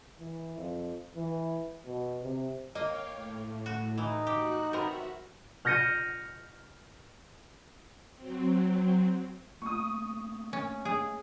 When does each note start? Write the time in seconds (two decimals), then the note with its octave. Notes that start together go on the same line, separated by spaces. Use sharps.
0.19 E3
0.58 F2
1.15 E3
1.86 B2
2.22 C3
2.75 A#3 C#5 D#5 F5 G5
3.10 A2
3.66 F#4
3.98 E3 D#4
4.27 F#4 G4 F#6
4.73 D#3 B3 C4 F#4 A#4 E5
5.65 F6 G6 A#6 C#7 D#7
8.16 F#3 C4
9.62 A3 A#3 C#6 D#6
10.53 C#4
10.85 G#4